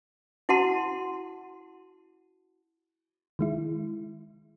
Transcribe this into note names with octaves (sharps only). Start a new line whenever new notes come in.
E4 F#4 F#5 A5 C6
D#3 G#3 E4